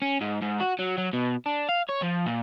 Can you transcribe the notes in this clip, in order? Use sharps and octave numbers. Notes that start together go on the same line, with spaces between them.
C#4
G#2
G#2
F#4
F#3
F#3
B2
D4
F5
C#5
F3
A#2